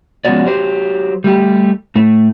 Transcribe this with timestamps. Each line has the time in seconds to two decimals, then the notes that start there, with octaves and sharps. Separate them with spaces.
0.25 F3 G#3 B3 C#4 F#4 D5
0.45 F#3 G4 C5
1.24 G3 A3 G4
1.96 A2 A3